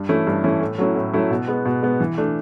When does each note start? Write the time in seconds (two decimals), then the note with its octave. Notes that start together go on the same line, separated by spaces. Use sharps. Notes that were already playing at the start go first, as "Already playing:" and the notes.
Already playing: G2
0.09 E3 A3 C#4 E4
0.27 G2
0.44 E3 A3 C#4 E4
0.61 A2
0.78 F#3 A3 C#4 E4
0.96 A2
1.14 F#3 A3 C#4 E4
1.31 B2
1.48 G#3 B3
1.65 B2
1.82 G#3 B3
2.00 E3
2.18 A3 D4